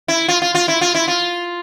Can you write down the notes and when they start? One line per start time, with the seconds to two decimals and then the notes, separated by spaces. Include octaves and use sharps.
0.08 E4
0.28 F4
0.42 F4
0.55 F4
0.68 E4
0.81 F4
0.95 E4
1.08 F4